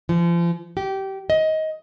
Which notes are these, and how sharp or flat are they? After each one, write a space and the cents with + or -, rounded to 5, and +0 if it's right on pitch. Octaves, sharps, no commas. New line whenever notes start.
F3 -35
G4 -20
D#5 +20